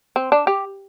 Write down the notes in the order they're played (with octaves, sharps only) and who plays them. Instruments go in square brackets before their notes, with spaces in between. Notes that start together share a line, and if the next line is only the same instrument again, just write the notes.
[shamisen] C4
D4
G4